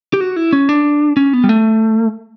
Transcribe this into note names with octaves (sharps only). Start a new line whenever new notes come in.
G4
F#4
E4
C#4
D4
C#4
B3
G3
A3